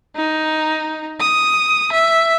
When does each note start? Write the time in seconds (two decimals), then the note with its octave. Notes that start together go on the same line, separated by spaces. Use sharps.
0.16 D#4
1.21 D#6
1.93 E5